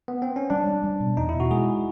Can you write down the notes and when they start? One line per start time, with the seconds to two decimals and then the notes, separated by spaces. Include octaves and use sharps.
0.08 B3
0.22 C4
0.36 C#4
0.50 G3 D4
0.67 G3
0.84 G3
1.00 B2
1.17 E2 D#4
1.29 E4
1.34 B2
1.40 F#4
1.51 G#3 G#4